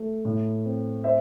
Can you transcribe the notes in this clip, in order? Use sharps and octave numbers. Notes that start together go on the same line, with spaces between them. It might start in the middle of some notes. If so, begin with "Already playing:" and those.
Already playing: A3
A2
C4
C5 E5